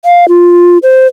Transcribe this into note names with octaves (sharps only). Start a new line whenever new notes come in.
F5
F4
C5